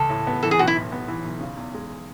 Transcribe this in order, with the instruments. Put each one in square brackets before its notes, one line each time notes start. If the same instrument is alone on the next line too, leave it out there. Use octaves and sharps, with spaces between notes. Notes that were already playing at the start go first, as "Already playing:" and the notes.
Already playing: [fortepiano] C#2 [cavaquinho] A4
[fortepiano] A2
B3
[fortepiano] E3 [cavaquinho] A4
[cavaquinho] G#4
[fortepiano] B1 [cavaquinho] F#4
[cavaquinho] E4
[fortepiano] A2
B3
E3
B1
C#3
E2
G#3